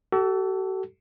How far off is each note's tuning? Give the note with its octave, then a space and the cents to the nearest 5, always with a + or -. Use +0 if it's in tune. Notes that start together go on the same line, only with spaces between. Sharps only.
F#4 +45 A4 +0